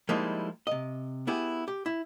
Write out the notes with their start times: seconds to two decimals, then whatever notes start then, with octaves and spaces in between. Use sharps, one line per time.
0.09 F3 G3 G#3 A#3 D#4 E4
0.67 C3 D#5
1.27 B3 E4 G4 G#4
1.68 G4
1.86 E4